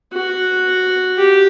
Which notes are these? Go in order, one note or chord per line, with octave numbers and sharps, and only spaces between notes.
F#4
G4